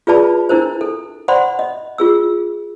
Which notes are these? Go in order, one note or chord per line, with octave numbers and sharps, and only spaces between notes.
F4 G#4 B4 D5 A5 B5
D4 E4 A#4 C5
A4
C5 D5 F#5 B5 C6
D#5
F4 G#4 E6